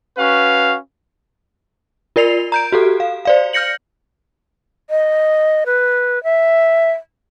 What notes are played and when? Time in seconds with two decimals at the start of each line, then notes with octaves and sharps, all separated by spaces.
0.18 C#4 F#4 B4 F5
2.16 F4 A#4 D5 C7 F7
2.52 A#5 G6 D7
2.72 F#4 G4 A4
3.00 F5
3.25 C5 D5 F5
3.53 F6 G6 A#6 C#7 F#7
4.90 D#5
5.66 B4
6.24 E5